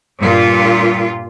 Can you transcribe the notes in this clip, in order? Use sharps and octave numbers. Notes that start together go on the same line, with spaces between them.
G2 A#2 F4